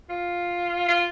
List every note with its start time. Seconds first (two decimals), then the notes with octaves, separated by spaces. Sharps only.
0.10 F4
0.89 F4